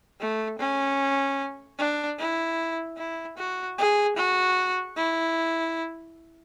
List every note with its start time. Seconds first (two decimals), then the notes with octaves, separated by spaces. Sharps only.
0.20 A3
0.59 C#4
1.78 D4
2.19 E4
2.97 E4
3.37 F#4
3.78 G#4
4.17 F#4
4.97 E4